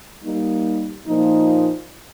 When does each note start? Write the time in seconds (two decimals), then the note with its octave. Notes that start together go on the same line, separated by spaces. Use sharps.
0.23 G3 A#3 D#4
1.06 A#2 F3 A#3 D#4